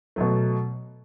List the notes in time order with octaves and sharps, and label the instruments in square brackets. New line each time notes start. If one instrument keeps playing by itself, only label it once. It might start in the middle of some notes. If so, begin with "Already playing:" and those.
[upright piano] B2 F#3 A3